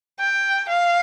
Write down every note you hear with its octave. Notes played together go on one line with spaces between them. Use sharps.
G5
F5